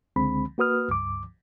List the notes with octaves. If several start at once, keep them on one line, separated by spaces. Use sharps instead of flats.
C#2 D3 G#3 C4 B5
A#3 F#4 B4 D#6 F6
C#2 G2 D6